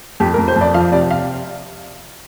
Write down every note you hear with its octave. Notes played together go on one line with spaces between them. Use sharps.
F2 G4
A#4
F2
C5
F2
D5
F3 F5
C3 D5
F5